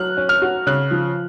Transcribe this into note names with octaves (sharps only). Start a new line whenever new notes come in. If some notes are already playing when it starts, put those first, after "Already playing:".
Already playing: F#3 F6 F#6
C#4
F6
F#4
C#3 F#6
F3